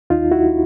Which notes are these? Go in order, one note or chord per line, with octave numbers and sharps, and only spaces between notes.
D#2 D#4 F4
E4 F#4